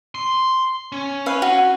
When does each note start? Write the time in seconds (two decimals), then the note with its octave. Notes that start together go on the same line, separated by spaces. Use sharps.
0.15 C6
0.92 C#4
1.26 B4 F5
1.42 F#4